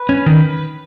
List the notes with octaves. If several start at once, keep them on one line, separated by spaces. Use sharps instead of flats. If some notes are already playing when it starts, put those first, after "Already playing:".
Already playing: B4
C#4
D#3